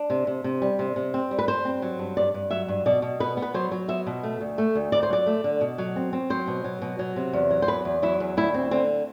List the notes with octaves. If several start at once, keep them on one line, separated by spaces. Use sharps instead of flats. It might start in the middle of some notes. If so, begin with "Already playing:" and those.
Already playing: D4
C3
C3
C3
G3
C3
C3
C4
G3
B4
G2 C5
C4
F#3
G2
G2 D5
G2
F#3 E5
G2
B2 D5
B2
B3 B4
B3
B4
F#3 C5
F#3
B3 E5
B2
A3
D2
A3
D2
D2 D5
C5
F#3 D5
A3
D3
B2
F#3
C4
C4
F#3 C5
B2
F#3
B2
F#3
C3
E2
F#3
C5
E2 B4
E2
F#3 E4
E2
D2 E4
C4
D3 C4